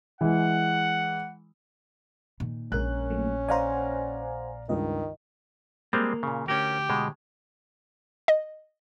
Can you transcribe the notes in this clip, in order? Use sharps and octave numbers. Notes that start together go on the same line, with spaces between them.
E3 G#3 F#5
A#2 D#3
A#1 G#3 C#4 A#4 F#6
F#3 A3 A#3
C5 D5 F5 F#5 G#5 A#5
C#2 G2 D#3 D#5
G3 G#3 A#3 C4
A#2 C#3
D2 C#4 G4 A#4
B2 G#3
D#5